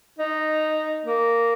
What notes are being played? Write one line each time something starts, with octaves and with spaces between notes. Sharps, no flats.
D#4
A#3